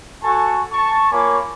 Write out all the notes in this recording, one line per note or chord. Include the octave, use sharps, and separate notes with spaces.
F#4 A4 G#5 A5 C#6
A5 C#6
A#3 F4 C#5 G#5 B5 D6